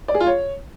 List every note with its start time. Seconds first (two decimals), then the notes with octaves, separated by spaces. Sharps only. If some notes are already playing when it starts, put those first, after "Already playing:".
0.08 D5
0.14 G#4
0.20 F4
0.27 C#5